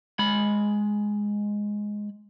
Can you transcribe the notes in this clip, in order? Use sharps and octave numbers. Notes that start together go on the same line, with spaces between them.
G#3 B5